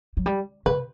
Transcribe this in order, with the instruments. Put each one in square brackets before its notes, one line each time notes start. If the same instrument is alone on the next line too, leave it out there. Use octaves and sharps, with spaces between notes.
[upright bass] F#3
G3
[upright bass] C#3 [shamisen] B4